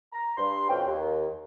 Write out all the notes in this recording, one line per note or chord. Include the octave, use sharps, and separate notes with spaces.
A#5
G2 C6
F2 B2 C4 C#4 G5
D#2